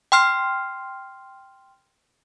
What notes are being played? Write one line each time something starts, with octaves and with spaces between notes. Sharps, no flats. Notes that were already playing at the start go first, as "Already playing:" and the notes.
G5 C6 F6 C7